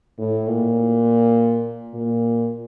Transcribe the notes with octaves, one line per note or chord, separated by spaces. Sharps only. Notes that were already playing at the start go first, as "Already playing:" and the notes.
A2
A#2
A#2